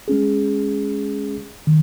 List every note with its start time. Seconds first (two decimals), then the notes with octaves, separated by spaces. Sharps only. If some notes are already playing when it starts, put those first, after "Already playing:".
0.08 G#3 C#4 G#4
1.67 D#3